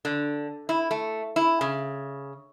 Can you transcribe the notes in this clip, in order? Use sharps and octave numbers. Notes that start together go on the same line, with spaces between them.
D3
E4
A3
E4
C#3